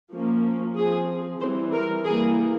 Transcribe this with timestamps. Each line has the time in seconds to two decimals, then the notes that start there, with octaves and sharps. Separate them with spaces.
0.11 F3 A#3 C#4
0.76 F3 C4 G#4
1.40 E3 G3 C4 C5
1.73 A#4
2.05 E3 G3 A#3 G#4